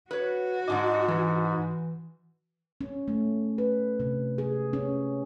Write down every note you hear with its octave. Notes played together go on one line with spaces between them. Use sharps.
F#4 B4 C#5
G#2 G#3 D4 D#5 D6
E3 E4
C#4
A3
B4
C3
G#4
C#4